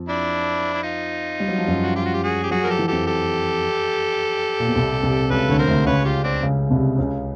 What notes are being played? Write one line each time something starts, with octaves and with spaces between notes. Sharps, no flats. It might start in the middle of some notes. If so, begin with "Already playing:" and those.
Already playing: F2 F3
D4 E4
E4
D#4 F4
G3
F#3
F3
F#2 F#3
F#4
F4 G4
F#4
G4
F#4 G#4
G4
F#3 F#4 G#4
F3 A#4
G4 A4
E3
F2 F3 G4 A4
G4 A4
A#2
B2
C2 C3
C2 C3
C#2 C#3 A4 B4
D2 D3 C#5
A#4 C5
D2 D3
C#2 C#3 B4 C#5
F4 G4
C4 D4
C#2 C#3
C2 C3
C#2 C#3